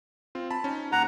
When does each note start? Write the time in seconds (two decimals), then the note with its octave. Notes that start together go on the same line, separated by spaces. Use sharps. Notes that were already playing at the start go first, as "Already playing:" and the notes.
0.35 C4 F4
0.51 A5 B5
0.64 C#4 D#4
0.92 D#2 F#5 A#5